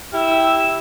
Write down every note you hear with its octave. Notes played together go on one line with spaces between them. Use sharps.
E4 G4 E6